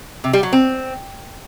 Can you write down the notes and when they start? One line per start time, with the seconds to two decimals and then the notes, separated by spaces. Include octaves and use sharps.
0.24 C3
0.33 G3
0.43 F#3
0.53 C4